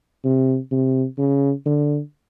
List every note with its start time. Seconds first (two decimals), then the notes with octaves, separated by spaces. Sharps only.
0.24 C3
0.72 C3
1.18 C#3
1.66 D3